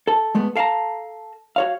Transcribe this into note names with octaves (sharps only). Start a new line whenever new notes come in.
A4 A5
G#3 A3 B3
A4 F5 G5 A5 A#5
F#4 C#5 F5